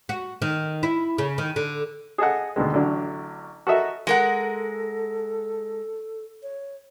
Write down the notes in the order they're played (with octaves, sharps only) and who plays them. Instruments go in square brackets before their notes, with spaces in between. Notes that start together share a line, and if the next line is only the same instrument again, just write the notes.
[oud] F#4
D#3
E4
C#3
D#3
D3
[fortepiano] G#4 A4 D#5 F#5
D2 B2 D#3 G#3
A1 D3 F#3 D5
F#4 A4 A#4 D#5 E5
[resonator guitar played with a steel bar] G#3 A#4 F#5 [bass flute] A4
[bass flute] C#5